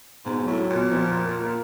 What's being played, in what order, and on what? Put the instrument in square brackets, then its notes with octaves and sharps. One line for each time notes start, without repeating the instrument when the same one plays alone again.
[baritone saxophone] G#2 [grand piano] B2
[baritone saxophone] A2 [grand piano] F#3
[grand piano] F#3
[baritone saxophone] A#2
[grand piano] B2
F3
A#3
A#3
A#3